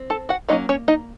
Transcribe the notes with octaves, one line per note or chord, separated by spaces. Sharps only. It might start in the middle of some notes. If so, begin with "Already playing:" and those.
Already playing: C4
A4 A5
F#4 F#5
F#3 A#3 C#4 D#4 D#5
C#4 C#5
D#4 D#5